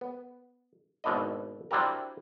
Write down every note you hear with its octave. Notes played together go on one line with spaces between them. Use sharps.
B3
G#1 B2 D4 E4 D#5
C4 D4 E4 F#4 G4 A#4